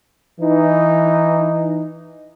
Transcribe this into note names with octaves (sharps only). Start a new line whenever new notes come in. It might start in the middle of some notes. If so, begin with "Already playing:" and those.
E3 D#4